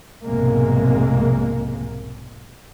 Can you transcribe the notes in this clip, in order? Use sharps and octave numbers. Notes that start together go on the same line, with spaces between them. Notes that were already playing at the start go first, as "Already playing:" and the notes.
B1 F2 G#2 C3 G#3 A#3